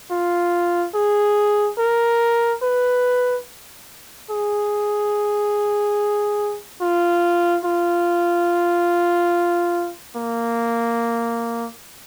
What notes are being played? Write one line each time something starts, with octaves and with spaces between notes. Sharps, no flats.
F4
G#4
A#4
B4
G#4
F4
F4
A#3